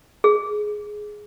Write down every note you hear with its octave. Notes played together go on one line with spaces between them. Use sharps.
G#4